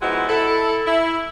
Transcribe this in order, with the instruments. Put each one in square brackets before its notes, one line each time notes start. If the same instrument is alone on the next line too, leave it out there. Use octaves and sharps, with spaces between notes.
[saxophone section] F3 G#3 B3 D#4 E4 F#4
E4 A4
E4